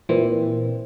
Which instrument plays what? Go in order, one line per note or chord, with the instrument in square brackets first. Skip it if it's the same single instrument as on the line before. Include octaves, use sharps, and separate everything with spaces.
[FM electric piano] A#2 E3 C4